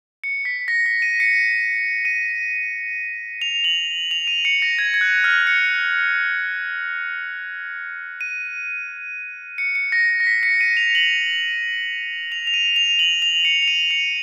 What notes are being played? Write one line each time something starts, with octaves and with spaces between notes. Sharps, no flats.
C#7
B6
A#6
B6
D#7
C#7
D#7
F7
F#7
F7
D#7
C#7
A#6
G#6
G#6
F#6
F6
C#7
D#7
C#7
C#7
A#6
A#6
B6
C#7
D#7
F7
F#7
F7
F7
D#7
F7
F#7
F7
C#7
F7
D#7
C#7